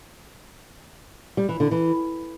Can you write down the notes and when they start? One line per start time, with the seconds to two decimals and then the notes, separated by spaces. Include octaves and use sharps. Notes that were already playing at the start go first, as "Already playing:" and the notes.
1.37 G3
1.49 E3
1.60 D3
1.71 E3